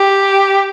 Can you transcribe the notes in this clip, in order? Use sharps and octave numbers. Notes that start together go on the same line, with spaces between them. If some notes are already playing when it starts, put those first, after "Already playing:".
Already playing: G4